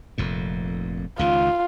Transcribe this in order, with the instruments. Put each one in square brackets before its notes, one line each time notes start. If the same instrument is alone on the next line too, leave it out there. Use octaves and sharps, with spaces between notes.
[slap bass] F1 F2 A#2
[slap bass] C#2 D#3 [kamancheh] F4